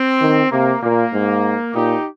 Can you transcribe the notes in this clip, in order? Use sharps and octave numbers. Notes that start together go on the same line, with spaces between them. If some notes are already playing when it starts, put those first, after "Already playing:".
Already playing: C4
D#3
C3 A#3
A#2 A#3
G#2
A#2 D#4 G4